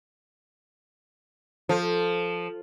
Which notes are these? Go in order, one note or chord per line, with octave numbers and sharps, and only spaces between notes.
F3 A4